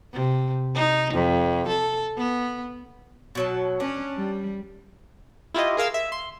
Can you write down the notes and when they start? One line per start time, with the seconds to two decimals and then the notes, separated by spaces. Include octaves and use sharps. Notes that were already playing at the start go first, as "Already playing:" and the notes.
0.13 C3
0.75 D#4
1.13 F2
1.68 A4
2.17 B3
3.35 B2 F#3 A5
3.80 C#4 D4
4.17 G3
5.54 E4 F4 G4 D#5
5.77 G#4 A#4 F5 E6
5.94 E5
6.12 C6